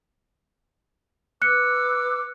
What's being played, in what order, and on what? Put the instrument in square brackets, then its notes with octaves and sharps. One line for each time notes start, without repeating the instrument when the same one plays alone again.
[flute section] B4 D6 E6 [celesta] F#6 C#7